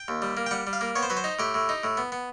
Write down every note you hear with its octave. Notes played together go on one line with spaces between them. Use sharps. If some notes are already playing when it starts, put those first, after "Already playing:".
Already playing: G5
D#2
G3
A#3
G5
G3 F#5
G3
F5
A#3
B3 C#5
C5
F#3 B4
C5
D#4
A2 G4
A2
D#4
A2
B3
B3